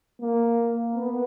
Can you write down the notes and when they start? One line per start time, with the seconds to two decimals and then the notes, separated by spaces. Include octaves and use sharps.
0.21 A#3
0.95 B3